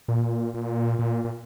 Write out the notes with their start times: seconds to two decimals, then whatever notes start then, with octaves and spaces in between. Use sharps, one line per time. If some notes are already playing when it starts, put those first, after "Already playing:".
0.08 A#2
0.54 A#2
0.99 A#2
1.24 A#2